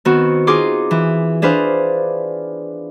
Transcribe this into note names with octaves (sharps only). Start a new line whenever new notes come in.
D#3 B3 C4 F#4
D#4 F4 G#4 C6 D6
E3
D4 G#4 B4 C5 F5